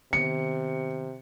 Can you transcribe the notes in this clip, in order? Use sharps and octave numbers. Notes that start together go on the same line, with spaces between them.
C3 D#3 B3 C#7